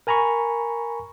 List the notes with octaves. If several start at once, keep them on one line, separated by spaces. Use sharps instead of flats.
A#4 G#5 A#5 B5 C#6